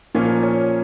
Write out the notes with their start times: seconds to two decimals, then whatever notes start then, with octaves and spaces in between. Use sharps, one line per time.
0.15 A#2 F3 A#3 C#4 C#5
0.43 C#5